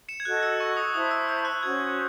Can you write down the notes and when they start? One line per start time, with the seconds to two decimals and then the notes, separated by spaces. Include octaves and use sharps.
0.09 C#7 E7
0.20 G#6
0.25 F#4 A4 D#5 F#6
0.43 E6
0.60 C#6
0.77 D#6
0.94 E4 C5 E5 A5 D#6
1.11 E6
1.29 E6
1.45 F#6
1.63 C#4 F#4 C5 G#6